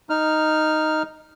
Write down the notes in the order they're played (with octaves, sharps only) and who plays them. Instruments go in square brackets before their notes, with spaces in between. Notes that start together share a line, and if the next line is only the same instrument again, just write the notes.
[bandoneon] D#4 F6